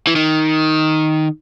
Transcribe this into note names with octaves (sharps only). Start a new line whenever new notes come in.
E3
D#3